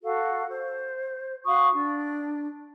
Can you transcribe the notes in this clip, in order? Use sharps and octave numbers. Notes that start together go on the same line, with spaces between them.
F#4 A4 F5
C5
F#4 F5 C#6 D#6
D4